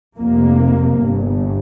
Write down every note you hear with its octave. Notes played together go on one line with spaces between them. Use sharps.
F1 F2 C3 A#3
G1 G2